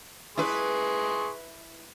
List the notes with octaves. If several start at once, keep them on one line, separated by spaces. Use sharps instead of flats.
E4 G#4 B4 C6 C#6